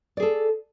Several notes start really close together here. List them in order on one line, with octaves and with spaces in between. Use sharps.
D5 G#4 A4